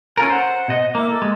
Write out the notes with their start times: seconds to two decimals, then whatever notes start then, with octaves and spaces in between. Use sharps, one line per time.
0.17 C#4 F4 A4 A#4 G#5
0.30 C5 F#5
0.68 B2 D#5
0.95 A#3 E4 D6
1.08 A4
1.22 G#3